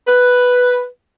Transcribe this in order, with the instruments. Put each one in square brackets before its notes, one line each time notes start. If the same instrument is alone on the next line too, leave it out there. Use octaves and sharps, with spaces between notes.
[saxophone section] B4